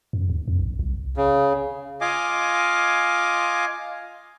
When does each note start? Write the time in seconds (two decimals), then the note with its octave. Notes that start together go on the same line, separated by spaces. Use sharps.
0.13 F#2
0.30 D#2
0.48 F2
0.59 A#1
0.79 C2
1.17 C#3
2.01 F4 D#5 F5 G#5 D6